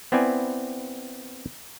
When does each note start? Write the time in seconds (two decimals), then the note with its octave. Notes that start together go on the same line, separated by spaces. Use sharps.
0.12 B3 C4 E4 D5 G#5